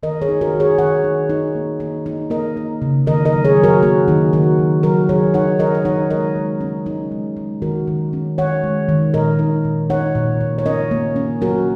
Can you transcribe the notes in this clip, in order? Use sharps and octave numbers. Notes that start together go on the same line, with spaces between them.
D#3 A#4 D#5
G#4 C#5
D#4
F#4 A#4
D#3
G#4 C#5
D#3 C#5 F#5
D#4
D#4
A#3
D#4
D#4
A#3 A#4 D#5
D#4
C#3
D#3 A#4 D#5
A#4 D#5
F#3
G#4 C#5
F#3
F#4 A#4
A#3 F#4
D#3 D#4
D#3 F#4
F#3
F#3 F#4 A#4
F#3 G#4 C#5
D#4 C#5 F#5
D#4 A#4 D#5
D#5
D#4 C#5 F#5
G#3 A#4 D#5
G#3
C#4
G#3 D#4
G#3
G#3
D#3 F#4 A#4
D#3
C#4
D#3 C#5 F#5
G#3
D#3
A#2 A#4 D#5
D#4
A#2
D#4 C#5 F#5
A#2
A#2
C#5
C#4 A#4 D#5
A#3
C#4
F#3 F#4 A#4